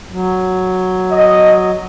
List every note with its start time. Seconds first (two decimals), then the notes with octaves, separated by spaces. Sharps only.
0.11 F#3
1.11 D#5